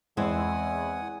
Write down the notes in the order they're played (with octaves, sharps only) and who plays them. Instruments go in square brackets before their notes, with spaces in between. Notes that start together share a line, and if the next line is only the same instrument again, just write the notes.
[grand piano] E2 [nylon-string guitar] G#3 C4 E4 [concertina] F#5 G#5 D#6